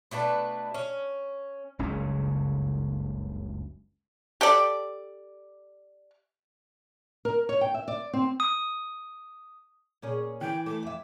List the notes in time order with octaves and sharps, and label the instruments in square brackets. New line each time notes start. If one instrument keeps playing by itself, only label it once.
[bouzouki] B2 A3 D4 B4
C#4
[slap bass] F#1 C#2 G2 C#4
[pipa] G4 A4 D5
[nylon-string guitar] A#4
C#5
G5
E5
D5
C4
[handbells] D#6
[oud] A#2 C#4 G#4
[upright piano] E3 [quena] G5
[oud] A3 [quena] D6
[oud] F2 E5